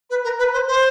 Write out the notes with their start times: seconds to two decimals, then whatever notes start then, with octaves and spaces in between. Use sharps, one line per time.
0.10 B4
0.23 A#4
0.38 B4
0.53 C5
0.67 C5